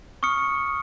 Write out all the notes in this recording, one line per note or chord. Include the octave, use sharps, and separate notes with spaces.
C#6 D#6 F6 C#7